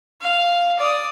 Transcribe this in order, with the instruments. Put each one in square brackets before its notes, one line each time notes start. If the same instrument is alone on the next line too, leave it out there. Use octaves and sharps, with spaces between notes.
[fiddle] F5
D5 D#6